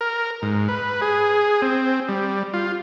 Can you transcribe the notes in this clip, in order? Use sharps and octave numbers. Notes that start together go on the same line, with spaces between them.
A#4
G#2
B4
G#4
C4
G3
F4